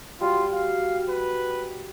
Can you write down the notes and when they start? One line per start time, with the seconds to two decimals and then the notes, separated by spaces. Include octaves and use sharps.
0.21 G3 F4 F#4
0.53 F5
1.10 B4